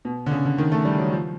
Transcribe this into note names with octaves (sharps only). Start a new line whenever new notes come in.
B2
D3
C#3
D3
D#3
A3
G3
F#3
F3